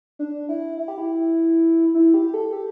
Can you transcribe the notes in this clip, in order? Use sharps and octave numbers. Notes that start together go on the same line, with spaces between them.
D4
E4
E4
G4
E4
E4
G4
A4
G4